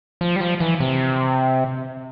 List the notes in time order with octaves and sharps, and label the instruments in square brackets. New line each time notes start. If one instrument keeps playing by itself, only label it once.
[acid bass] F3
G3
F3
E3
C3